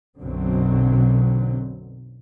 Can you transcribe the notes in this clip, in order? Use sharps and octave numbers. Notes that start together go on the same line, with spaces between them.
B1 F#2 B2 D3 F#3 C4